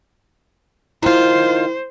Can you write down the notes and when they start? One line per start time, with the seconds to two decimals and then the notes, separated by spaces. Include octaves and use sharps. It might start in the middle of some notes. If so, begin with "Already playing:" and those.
1.03 D#3 E4 F4 C5